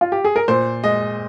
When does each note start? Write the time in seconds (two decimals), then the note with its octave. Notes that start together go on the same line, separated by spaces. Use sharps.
0.01 F4
0.12 G4
0.24 G#4
0.36 A#4
0.48 A#2 C5
0.84 G#3 D#5